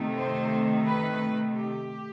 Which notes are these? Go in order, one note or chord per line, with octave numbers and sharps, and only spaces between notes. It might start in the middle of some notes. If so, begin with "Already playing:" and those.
Already playing: C3 D#3 A3
C5
B4
G4